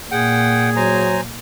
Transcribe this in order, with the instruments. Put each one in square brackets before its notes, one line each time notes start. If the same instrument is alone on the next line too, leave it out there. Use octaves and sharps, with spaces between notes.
[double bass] A#2 [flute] G#4 [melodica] F#5 G5
[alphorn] F#3 [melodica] C5 G#5 A#5